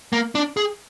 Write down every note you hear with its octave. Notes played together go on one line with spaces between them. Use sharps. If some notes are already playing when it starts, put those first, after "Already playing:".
A#3
D4
G#4